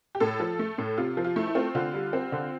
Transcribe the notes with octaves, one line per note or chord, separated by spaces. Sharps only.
G4
A2 A4
F3
A3
A2
C3 F4
F3
F4
A3 E4
E4
C4 F4
D3 F4
G3
C4
D3